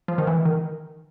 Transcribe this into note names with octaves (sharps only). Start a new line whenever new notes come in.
F3
D#3
E3
D#3